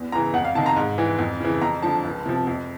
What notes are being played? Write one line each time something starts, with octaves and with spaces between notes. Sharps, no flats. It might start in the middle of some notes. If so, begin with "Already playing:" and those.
Already playing: E2
C#3 E3 A#5
F2 F#5
F5
C3 D#3 A5
A#5
G#2
E3
F2
C#3 E3
F2 A#5
D3 F3 A5
C#2
C3 F3
F2